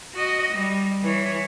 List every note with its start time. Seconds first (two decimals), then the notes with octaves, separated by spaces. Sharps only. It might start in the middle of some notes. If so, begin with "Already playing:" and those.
0.14 F#4 D#5
0.53 G3
1.03 E3 C#5